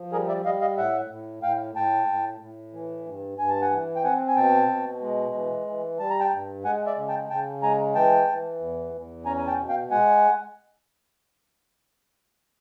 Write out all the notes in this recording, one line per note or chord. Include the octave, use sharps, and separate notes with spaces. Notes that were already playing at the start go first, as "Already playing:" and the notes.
Already playing: F3
G3 G#4 A#4
D5 E5
G3 D#5 F5
D#5 F5
A2 E5 F#5
A2
A2 F5 G5
A2 G5 A5
A2
A2
E3
G2
G2 G#5
A5
F#5 G#5
E3
G5
C4 F#5 G#5
G#5
B2 G5 A5
B2
G#3
E3
E3
G3 A5
A#5
G5 A5
G2
G#3 F#5 G#5
D5 E5
C#3
G5 A5
C#3 G5 A5
G#3 G#5 A#5
E3 G5 A5
E3
E2
E2
C#4 G#5 A#5
G#5
G5 A5
B2
F5 G5
G#3 F#5 G#5